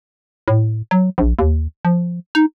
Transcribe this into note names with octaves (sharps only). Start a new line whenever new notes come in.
A2
F#3
A#1
D#2
F3
D#4